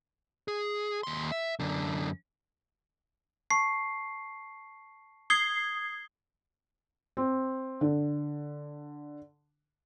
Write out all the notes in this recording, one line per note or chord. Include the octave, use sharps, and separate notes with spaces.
G#4
D#2 C6
E5
F#2 D3
A5 C#6 C7
D#6 G#6 C7 G7
C4
D3